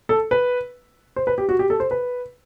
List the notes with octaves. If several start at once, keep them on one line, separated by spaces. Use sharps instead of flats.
A4
B4
C5
B4
G4
F#4
G4
A4
C5
B4